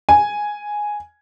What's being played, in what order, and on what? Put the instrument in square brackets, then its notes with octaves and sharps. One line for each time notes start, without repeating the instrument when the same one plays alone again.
[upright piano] G#5